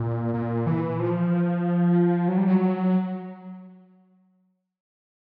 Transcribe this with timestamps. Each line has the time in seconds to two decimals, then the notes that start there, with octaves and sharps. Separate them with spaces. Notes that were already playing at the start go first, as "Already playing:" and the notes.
Already playing: A#2
0.34 A#2
0.67 E3
0.99 F3
2.28 F#3
2.38 G3
2.47 F#3